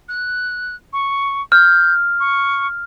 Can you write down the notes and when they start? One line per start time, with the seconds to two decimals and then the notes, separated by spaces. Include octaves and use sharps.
0.09 F#6
0.93 C#6
1.52 F6 G6
2.20 C#6